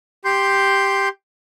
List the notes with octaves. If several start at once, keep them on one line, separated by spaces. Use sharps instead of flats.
G4 C6 G6